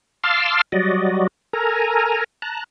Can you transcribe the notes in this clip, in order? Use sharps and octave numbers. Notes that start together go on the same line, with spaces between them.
F5 A5 C6 D6 E6 F6
F#3 G3 F#4 D5 D#5
A4 A#4 G#5 A#5
A5 A#5 F#6